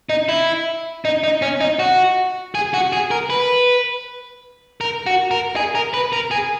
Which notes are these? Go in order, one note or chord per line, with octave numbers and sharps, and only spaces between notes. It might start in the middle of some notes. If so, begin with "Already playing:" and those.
D#4
E4
D#4
D#4
C#4
D#4
F#4
G#4
F#4
G#4
A#4
B4
A#4
F#4
A#4
G#4
A#4
B4
A#4
G#4